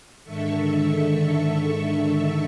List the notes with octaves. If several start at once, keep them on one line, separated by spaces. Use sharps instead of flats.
G#2 D3 D#3 A4 E5 C#6